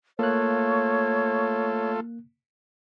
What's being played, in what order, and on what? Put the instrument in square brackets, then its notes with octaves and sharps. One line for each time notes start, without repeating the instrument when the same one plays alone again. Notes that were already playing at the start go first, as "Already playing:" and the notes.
[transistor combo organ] A3 F4 A4 [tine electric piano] A#3 F#6 [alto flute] C#5